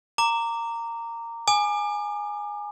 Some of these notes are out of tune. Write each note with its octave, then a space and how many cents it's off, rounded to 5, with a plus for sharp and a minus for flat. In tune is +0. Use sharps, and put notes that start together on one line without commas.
A#5 -15 D6 -5
G#5 +0 D6 +40